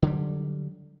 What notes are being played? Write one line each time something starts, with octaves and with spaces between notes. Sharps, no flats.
D3 F#3 G3